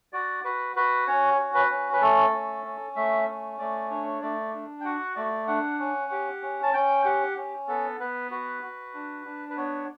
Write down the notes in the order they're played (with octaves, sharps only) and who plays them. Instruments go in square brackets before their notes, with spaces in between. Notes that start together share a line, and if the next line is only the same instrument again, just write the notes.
[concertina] F#4 D5
F#4 B4
F#4 B4
C#4 C#5
F#4
B4
C#4
B4
A3 A4
C#4
C#4
A3 E5
C#4
A3 D5
D4 C#5
A3 D5
D4
G5
F#4 F#5
A3 D5
D4 F#5
C#4
G4
C#4
A5
C#4 G5
G4 F#5
C#4
B3 A4
B3 B4
F#4 B4
F#4
D4
D4
B4
B3 C#5